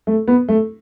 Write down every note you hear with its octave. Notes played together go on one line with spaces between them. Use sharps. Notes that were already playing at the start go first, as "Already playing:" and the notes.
A3
B3
A3